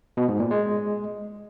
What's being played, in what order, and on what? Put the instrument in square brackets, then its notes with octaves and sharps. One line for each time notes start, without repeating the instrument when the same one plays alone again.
[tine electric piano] B2
G#2
A#2
G#3